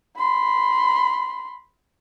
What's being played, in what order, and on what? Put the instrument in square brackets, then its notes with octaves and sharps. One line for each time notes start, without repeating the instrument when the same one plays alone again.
[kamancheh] B5 C6